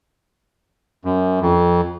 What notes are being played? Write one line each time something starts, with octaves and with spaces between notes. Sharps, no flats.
F#2
F2